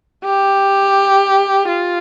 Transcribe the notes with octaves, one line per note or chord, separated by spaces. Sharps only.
G4
F4